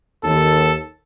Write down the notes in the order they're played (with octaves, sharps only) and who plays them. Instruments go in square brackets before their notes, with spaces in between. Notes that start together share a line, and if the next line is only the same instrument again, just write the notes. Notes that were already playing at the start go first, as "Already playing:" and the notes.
[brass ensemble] D#2 [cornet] A4